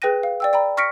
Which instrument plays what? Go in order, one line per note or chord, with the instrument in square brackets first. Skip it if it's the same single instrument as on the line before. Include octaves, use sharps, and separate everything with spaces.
[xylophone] G#4 B4 G5 F#6 A#6 D#7
F5
D5 G5 E6
D5 G5 A#5 B5
C#6 F6 A#6 B6 C#7 D7